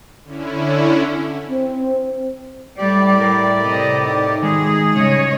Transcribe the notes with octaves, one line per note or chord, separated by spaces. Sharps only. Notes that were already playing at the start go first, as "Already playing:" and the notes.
D3 C#4 E4
C4
A2 G3 G4 D5
A#4
C3 D#5
D#4
D#3 G#3 G#4
C#3 G3 C#5 D#5